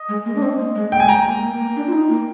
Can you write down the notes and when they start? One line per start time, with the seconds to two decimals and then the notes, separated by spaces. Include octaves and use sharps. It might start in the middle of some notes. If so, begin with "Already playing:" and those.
Already playing: D#5
0.09 G#3
0.25 A#3
0.35 D4
0.42 C4
0.59 A#3
0.75 G#3
0.92 A#3 G5
1.00 G#5
1.08 G#3 G5 A#5
1.25 A#3
1.42 A#3
1.59 A#3
1.76 D4
1.87 F4
1.92 D#4
2.09 A#3